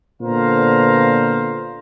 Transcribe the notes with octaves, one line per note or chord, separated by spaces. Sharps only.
A#2 D3 B3 C5 F5 A#5